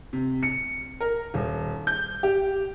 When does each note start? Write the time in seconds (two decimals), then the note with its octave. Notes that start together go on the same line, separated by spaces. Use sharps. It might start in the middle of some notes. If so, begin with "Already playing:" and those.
0.13 C3
0.43 C#7
1.00 A#4
1.34 D#1
1.87 G6
2.23 G4